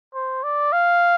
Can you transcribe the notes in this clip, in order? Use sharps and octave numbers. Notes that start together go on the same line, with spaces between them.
C5
D5
F5